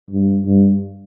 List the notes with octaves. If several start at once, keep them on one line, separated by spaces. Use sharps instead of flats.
G2
G2